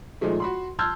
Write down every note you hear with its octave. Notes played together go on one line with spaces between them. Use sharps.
A#2 D#3 F3 G#3 A3
F#4 B5 C6
A5 C6 E6 F6 G6 G#6